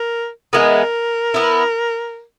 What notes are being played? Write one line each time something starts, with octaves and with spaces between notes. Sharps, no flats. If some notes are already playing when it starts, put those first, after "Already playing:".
Already playing: A#4
E3 G#3 B3 A#4
B3 E4